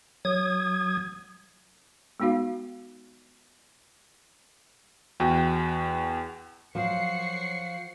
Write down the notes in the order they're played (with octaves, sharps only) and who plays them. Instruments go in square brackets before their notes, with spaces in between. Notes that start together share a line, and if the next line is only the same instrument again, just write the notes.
[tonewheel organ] F#3 D#6 G#6
[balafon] G#3 B3 D#4 F#4 F5
[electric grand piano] E2 F#4 G5
[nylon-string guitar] F3 [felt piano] F#3 [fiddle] F#5 C#6 [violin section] C7 C#7